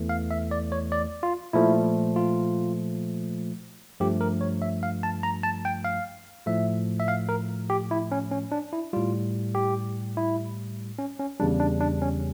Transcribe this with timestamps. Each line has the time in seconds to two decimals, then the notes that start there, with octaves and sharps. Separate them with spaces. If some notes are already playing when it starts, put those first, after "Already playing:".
Already playing: E2 E3 A3
0.09 F5
0.31 E5
0.51 D5
0.72 C#5
0.92 D5
1.23 F4
1.53 A#2 F3 A3 E4
2.16 F4
4.00 G2 F3 A3 G4
4.21 A#4
4.41 C#5
4.62 E5
4.83 F5
5.03 A5
5.23 A#5
5.43 A5
5.65 G5
5.85 F5
6.46 A2 F3 A3 E5
7.00 E5
7.08 F5
7.29 A#4
7.70 G4
7.91 E4
8.12 C#4
8.31 C#4
8.52 D4
8.73 E4
8.93 A2 G3 F4
9.55 G4
10.17 E4
10.99 C#4
11.19 C#4
11.40 E2 C#3 G3 D4
11.60 D4
11.81 D4
12.02 C#4